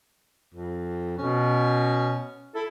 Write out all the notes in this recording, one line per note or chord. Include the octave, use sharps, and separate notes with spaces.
F2
B2 C#4
E4 A4